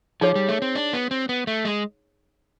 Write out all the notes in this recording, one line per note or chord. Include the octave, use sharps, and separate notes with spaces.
F3 D#4 G#4 C#5
G3
A3
C4
D4
B3
C4
B3
A3
G#3